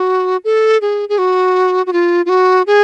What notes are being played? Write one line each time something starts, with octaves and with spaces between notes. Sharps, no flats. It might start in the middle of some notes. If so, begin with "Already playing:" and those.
Already playing: F#4
A4
G#4
G#4
F#4
F#4
F4
F4
F#4
G#4